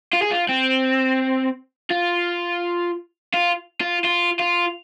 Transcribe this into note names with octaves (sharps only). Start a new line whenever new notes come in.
F4
G#4
F4
C4
F4
F4
F4
F4
F4